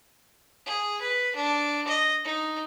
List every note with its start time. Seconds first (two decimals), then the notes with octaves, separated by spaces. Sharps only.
0.66 G#4
1.01 B4
1.35 D4
1.87 D#5
2.25 D#4